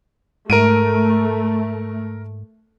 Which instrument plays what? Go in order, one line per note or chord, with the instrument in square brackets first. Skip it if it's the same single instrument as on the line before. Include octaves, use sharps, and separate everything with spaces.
[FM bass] G#2 [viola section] A3 [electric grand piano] A#4 D7 D#7